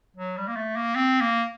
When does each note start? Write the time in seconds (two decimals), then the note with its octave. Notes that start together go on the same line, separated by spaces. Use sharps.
0.17 F#3
0.37 G3
0.48 A#3
0.57 A3
0.76 A#3
0.95 C4
1.21 A#3